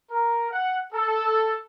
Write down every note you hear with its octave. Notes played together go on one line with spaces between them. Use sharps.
A#4
F#5
A4